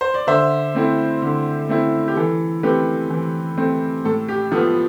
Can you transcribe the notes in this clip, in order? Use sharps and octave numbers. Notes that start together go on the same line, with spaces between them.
C5
D5
D3 C5 E5
A3 C4 E4
D3
A3 C4 E4
G4
E3 A4
A3 C4 G4 B4
E3
A3 C4
A2 A4
G4
F3 B3 A4